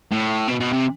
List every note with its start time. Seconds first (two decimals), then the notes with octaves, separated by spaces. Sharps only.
0.11 A2
0.48 B2
0.60 B2
0.72 C3